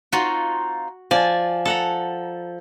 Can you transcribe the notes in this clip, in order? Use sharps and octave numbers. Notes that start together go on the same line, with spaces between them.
C4 D#4 F4 F#4
F3 D5 G#5
A4 F#5 A#5